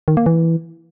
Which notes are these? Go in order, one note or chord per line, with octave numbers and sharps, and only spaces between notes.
D#3
A#3
E3